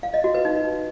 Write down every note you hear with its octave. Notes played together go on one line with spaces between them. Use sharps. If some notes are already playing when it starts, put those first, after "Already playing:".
F5
D#5
F#4
B4
D#4